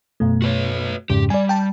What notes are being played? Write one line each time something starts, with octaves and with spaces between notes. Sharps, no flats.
F#2 B2 A3
F#4 B4 C#5
F2 G#2 C#3 G4
G3 D5 G#5
G5 A5